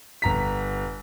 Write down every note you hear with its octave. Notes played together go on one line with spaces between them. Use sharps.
G1 A#5 B6